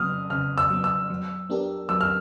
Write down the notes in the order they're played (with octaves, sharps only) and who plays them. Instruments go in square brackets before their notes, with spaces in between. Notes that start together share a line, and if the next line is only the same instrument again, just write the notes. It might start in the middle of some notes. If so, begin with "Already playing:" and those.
Already playing: [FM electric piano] C#3 F#3 B3 [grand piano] D#6 F6
[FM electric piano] C#3 [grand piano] F6
[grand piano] E6
[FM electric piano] F#3 B3
[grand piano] E6
[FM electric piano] F#3
B3 D4 G4 A#4
[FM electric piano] F#3 [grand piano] E6
[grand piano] F6